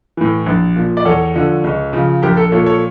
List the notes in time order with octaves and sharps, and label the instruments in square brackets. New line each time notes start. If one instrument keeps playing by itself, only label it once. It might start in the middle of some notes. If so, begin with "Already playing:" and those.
[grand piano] A2 E3
A#1
A#2 F3
D5
E2 A4 C#5
D3 F3
C#2
C#3 F3
A#1 G4 A#4
A4
A#2 F3 A4 C#5
A4 C#5